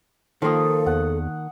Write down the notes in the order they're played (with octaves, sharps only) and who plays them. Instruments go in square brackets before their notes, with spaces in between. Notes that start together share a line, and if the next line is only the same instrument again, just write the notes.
[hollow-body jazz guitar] D#3 A#3 [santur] F3 F4 D#6 [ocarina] A4
[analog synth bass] E2 [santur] F#5